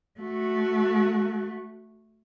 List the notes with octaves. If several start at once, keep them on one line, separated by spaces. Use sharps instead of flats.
A3 F#4